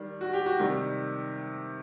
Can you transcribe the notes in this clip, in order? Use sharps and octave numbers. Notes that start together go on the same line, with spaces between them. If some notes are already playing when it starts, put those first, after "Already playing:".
Already playing: D#3 G3 D4
F#4
G4
F#4
C3 D#3 G3